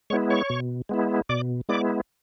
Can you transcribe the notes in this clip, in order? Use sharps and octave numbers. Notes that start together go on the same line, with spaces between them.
G#3 B3 E4 C#5 C#6
C#5 C#6
B2
G#3 B3 E4
B2 D5 D6
G#3 B3 E4 D5 D6